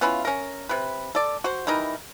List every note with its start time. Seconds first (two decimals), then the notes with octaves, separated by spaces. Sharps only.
0.01 B3 C#4 E4 F4
0.25 C#4 A#4
0.69 C3 B4
1.15 A4 D5
1.44 F#4 C5
1.67 E3 G3 D#4 A#4